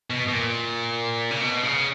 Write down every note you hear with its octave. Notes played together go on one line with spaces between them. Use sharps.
B2
B2
A#2
C#3
B2
C#3